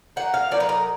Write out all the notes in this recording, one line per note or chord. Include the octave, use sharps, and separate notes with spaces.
F#3 A#3 D#4 F#5
F5
F#3 A#3 D#4 D5
B4
A#4